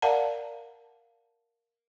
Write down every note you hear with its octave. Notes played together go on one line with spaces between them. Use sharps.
A#4 D5 F5 F#5 A5 A#5